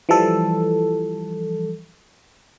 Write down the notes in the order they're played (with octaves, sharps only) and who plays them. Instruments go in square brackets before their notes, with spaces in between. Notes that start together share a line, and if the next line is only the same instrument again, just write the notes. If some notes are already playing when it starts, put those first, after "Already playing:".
[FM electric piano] E3 F3 G3 A4